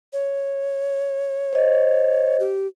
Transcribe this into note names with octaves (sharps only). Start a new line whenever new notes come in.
C#5
C5 D#5
G4